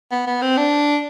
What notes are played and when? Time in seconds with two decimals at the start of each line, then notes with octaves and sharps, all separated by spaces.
0.12 B3
0.27 B3
0.42 C4
0.57 D4